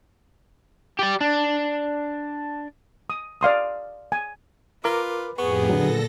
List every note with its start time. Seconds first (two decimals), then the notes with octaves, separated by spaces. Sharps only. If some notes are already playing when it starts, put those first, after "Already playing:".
0.99 G4 D5
1.21 D4
3.10 D#6
3.41 D5 F5 C6 D#6
4.12 G#5
4.84 F4 A#4 B4 D6
5.38 F2 A2 B3 G4 G#4 C#6
5.70 A#2 D3 F#3 A4 A#6